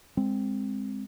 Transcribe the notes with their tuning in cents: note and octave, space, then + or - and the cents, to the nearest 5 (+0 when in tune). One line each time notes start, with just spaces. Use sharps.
G#3 -15 C4 +0